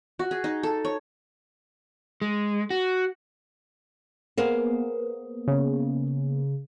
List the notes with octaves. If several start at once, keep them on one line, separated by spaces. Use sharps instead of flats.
F#4
G#4
D#4
A4
C#5
G#3
F#4
A#3 B3 G#4 A#4 C5
C#3